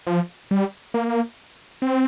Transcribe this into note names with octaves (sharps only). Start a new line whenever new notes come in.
F3
G3
A#3
C4